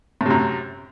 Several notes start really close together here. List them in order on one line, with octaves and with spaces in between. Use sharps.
A2 C3 F#2